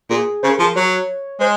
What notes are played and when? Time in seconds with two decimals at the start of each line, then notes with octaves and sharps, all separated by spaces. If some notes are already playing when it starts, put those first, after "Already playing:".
0.10 A#2 G#4
0.43 C#3 C5
0.50 A#4
0.57 F3 G#4
0.65 A#4
0.76 F#3 C#5
1.40 G#3 C5